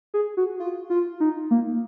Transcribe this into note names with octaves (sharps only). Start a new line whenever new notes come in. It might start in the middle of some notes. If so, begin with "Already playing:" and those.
G#4
F#4
F4
F4
D#4
A#3